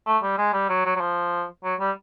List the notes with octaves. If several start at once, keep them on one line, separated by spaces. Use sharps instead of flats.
A3
G3
G#3
G3
F#3
F#3
F#3
F3
F#3
G3